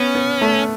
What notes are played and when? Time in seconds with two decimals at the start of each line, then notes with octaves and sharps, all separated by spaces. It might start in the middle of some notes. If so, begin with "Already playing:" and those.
Already playing: B3 C#4
0.15 B3
0.41 A3